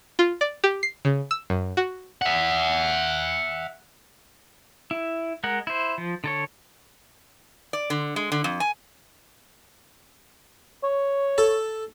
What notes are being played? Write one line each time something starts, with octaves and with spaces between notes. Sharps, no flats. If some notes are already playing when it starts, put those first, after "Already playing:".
F4
D5
G4
C7
C#3
E6
F#2
F#4
E5 F#5
E4
G#3 A#4 F#5
E4 C5
F3
D3 A4 C#5
D5
D3
G#3
D3
F2
G#5
C#5
A4